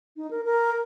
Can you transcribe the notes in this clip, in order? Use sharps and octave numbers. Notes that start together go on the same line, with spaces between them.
D#4
A#4
A#4